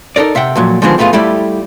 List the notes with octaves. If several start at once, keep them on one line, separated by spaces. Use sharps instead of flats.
D#4 A4 A#4 D5
C3 E5 F#5 G5
F2 A#2 F#3
D3 D#3 F3 G#3 B3 C4
A2 A3 B3 E4 F4 G#4
G3 A3 E4 G4 D5